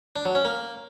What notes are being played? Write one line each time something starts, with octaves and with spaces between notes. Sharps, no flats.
D4
F#3
C#4
A#3